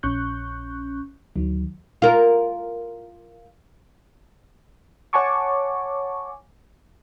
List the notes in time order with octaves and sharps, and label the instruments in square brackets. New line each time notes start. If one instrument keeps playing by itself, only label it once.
[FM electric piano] A#1 C#4 C#6 F#6 G6
D2 D#3 F#3
[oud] F4 A#4
[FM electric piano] C#5 F#5 G#5 A5 C#6 D6